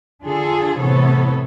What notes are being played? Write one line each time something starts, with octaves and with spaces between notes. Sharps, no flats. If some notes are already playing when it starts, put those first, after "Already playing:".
D3 D4 F4 G#4 A4
A2 C3 E3 B3 A4 C#5